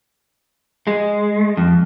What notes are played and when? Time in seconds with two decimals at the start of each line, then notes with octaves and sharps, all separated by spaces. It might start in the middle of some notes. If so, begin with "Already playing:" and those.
0.87 G#3
1.57 F2